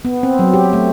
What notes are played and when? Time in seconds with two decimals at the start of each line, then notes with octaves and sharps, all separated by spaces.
0.05 B3
0.23 C4
0.39 F#3
0.53 G4
0.73 A3